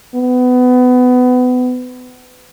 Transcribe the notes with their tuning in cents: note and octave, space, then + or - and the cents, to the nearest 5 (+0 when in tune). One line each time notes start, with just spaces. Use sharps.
B3 +25